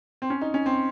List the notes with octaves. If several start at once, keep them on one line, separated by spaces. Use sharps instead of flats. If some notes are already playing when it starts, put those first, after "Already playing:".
C4
C#4
D#4
C#4
C4